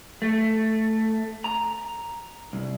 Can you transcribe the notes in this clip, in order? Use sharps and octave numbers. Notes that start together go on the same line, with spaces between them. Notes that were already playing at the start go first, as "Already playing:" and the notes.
A3
A#5
C2